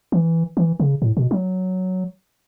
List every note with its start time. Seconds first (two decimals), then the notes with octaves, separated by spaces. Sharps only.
0.12 E3
0.57 E3
0.80 C#3
1.02 A2
1.17 B2
1.31 F#3